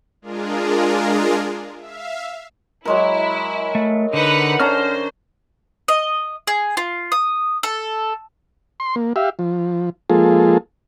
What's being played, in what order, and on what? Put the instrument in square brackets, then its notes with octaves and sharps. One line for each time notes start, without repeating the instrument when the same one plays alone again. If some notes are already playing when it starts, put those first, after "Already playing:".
[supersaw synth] G#3 D4 F4 G#4 A#4
E5 F5
[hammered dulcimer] F#3 G#3 A#4 [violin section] E4
[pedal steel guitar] A3
[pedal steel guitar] D3 [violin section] D#4 B4 F#5
[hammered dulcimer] D3 C#4 A#5 [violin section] C5 [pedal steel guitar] F6
[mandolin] D#5
G#4
F4
D#6
A4
[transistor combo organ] C6
A#3
G4 E5 F5
F3
F3 G#3 A#3 F4 G#4 A4